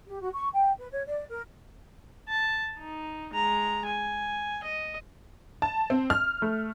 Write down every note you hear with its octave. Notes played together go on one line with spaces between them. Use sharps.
G4
F#4
C#6
G5
B4
C#5
D5
A#4
A5
D#4
G#3 A#5
G#5
D#5
A5
C4
F6
A3